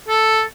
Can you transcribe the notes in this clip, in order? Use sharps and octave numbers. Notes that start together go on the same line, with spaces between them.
A4